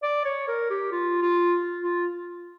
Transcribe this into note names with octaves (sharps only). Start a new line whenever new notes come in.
D5
C#5
A#4
G4
F4
F4
F4